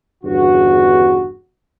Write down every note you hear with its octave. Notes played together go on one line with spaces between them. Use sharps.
G1 E2 G2 C#3 F#4